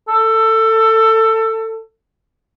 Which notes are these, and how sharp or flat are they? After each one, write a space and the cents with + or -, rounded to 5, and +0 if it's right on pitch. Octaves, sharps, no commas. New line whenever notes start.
A4 +20